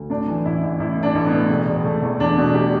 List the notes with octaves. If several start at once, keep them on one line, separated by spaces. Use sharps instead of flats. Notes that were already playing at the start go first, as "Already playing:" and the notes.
Already playing: D2
A2 D4
E3
A1 E4
A1
A1 E4
A2 D4
A1
B3
A2
E1
E1
E1 A3
E2
E2 D4
B2
G4